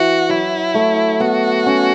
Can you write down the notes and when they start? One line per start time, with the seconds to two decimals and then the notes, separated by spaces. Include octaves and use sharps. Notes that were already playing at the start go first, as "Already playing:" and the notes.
Already playing: E3 F#4
0.29 F#3 E4
0.74 A3
1.20 B3 F#4
1.66 C#4